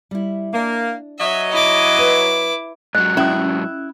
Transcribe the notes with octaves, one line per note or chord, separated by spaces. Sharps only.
G3 E4
A#3 D4
F#3 D#5 E5
E4 D6
B4
G#2 F#3 D#5 F#6
C#4 E4 D#6